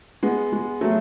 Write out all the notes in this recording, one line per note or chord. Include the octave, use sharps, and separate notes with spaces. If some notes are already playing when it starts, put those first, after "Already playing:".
G#3 B3
G#3
F#3 A3